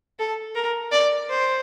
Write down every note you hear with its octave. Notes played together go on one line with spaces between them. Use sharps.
A4
A#4
D5
C5